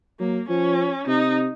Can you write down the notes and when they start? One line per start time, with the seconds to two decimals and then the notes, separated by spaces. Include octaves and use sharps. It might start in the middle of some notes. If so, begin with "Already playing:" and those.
0.20 F#3 A#3
0.49 F3 C#4
1.07 C3 D#4